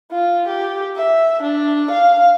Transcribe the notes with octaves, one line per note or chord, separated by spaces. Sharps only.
F4
G4
E5
D4
F5